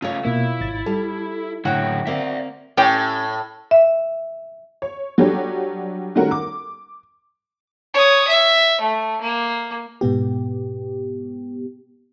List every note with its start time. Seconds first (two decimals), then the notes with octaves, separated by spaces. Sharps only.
0.02 C#3 A3 F4 C#5
0.25 B2 A#3 E4
0.61 G#1 A6
0.86 G3 A4
1.65 F#2 A2 D3 E4 F#4 G5
2.07 A#3 C4 D5 E5
2.77 A2 C#4 G4 G5
3.71 E5
4.82 C#5
5.18 F#3 G3 D4 G4 A4 C#5
6.15 D#3 G3 A3 C#4 F#4 A#4
6.31 D6
7.94 C#5 D#6
8.28 E5
8.81 A3
9.21 A#3
10.01 G#2 B2 B3 G4